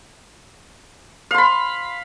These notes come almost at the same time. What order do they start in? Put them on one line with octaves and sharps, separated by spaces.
F5 C6 B5